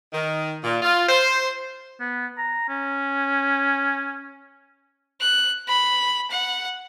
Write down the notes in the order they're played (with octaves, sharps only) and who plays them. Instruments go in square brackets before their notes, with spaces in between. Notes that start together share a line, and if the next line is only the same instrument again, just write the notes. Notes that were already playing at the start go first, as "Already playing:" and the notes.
[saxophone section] D#3
A#2
F4
C5
[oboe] B3
A#5
C#4
[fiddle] F#6
B5
F#5